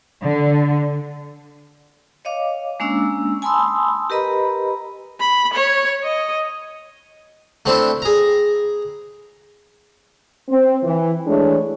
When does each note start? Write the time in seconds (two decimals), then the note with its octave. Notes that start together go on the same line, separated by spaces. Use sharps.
0.22 D3
2.25 C#5 D#5 F5 D6
2.80 G#3 A#3 C#4 D4 D6 E6
3.42 G#5 A5 B5 C6 D#6 E6
4.10 G4 A#4 B4 D#5 A#5 B5
5.20 B5
5.54 C#5
6.03 D#5
7.66 A3 C4 D4 E4
8.02 G#4 A#5
10.48 C4
10.83 E3
11.27 E3 G#3 A3 D4 C#5